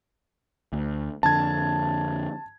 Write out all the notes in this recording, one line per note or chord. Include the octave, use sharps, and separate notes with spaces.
D2
F2 D3 A5 G#6